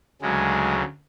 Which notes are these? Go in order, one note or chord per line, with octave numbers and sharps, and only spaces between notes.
D2 C#3 F#3 G#3